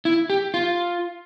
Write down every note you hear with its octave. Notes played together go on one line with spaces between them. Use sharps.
E4
G4
F4